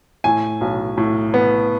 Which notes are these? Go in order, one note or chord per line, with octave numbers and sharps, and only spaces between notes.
A2 G#5
B1
A2
B3